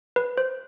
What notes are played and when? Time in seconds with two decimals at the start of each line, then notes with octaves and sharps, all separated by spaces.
0.16 B4
0.37 C5